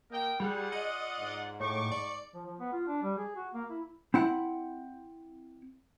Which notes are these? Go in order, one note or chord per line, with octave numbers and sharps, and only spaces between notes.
A#3 A#4 D#5 G5
G3 F4 G#4 D5 F#5
D#5
G#2
A2 C#6 D6
D5
F3
F3
B3
F4
D4
G3
G#4
F#4
A#3
E4
C4 E4 F#5